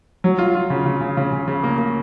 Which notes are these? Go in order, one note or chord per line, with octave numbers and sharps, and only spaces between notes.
F#3
F4
F4
C#3
C#3
C#3
C#3
C#3
C#3
A#3
A#3